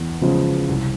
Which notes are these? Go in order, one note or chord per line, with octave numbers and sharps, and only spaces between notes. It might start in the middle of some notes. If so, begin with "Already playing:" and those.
Already playing: E2
C#3 F3 G#3
C2